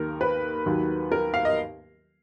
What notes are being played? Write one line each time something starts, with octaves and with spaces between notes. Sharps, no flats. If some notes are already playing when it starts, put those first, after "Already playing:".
Already playing: D#2 D#3 A#3 A#4
B4
D#2 D#3 F#3
A#4
F5
D#5